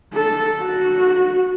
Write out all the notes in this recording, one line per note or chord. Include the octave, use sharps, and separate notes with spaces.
A4
F#4